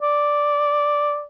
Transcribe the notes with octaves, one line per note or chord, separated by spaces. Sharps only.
D5